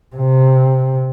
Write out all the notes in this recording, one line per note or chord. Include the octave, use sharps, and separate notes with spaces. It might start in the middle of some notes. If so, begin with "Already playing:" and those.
C3